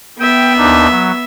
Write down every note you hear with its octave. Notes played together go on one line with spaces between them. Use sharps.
B3 E5 G5
D#2 D4 D#4
F#3